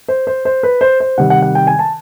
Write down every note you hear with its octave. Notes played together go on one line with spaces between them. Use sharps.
C5
C5
C5
B4
C5
C5
C3 D#3 G3 F#5
F#5
F#5
G5
G#5
A5